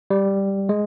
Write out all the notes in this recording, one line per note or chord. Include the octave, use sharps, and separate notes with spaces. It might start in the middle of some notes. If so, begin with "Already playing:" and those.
G3
G#3